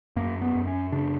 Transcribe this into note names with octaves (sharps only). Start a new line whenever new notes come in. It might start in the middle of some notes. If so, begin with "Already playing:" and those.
F#2 A#3
B3
F#2
C#4
C#3 D4